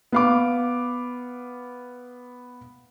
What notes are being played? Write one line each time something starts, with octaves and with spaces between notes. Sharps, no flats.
B3 F5 D6